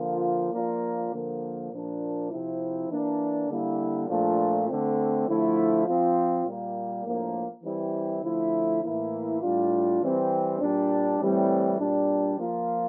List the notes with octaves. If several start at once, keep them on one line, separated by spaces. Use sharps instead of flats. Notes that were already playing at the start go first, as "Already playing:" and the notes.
Already playing: D3 F3 A#3 F4
F3 A#3 D4 F4
D3 F3 A#3
A#2 F3 A#3 D4
C3 F3 C4 E4
E3 A#3 D4
D3 G3 A#3 E4
A#2 F3 A3 D4 F4
D3 A3 C4
D3 F3 A3 E4
F3 C4 F4
A#2 G3 A#3
A2 F3 A#3 D4
E3 G3 C4 E4
D3 F3 A3 E4
A2 E3 A#3 E4
A2 G3 D4 F4
E3 G3 C4
A#2 G3 D4
A2 E3 G3 C4
A#2 G3 D4
F3 A#3 F4